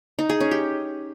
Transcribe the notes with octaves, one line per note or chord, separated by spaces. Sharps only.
D#4
G#4
C#4
G4